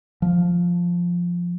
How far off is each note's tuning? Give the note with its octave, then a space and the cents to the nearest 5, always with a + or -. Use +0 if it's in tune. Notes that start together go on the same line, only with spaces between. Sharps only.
F3 +5